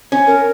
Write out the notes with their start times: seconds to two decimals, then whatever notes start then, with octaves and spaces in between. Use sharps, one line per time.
0.12 C#4
0.27 A#4